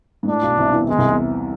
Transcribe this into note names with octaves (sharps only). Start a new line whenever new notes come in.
G#2
A2 D4
B1 B2
C2 C3
E2 E3
E2 E3 G#3
C2 C3
E2 E3